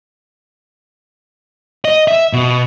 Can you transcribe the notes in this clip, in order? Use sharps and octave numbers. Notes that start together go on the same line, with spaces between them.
D#5
E5
B2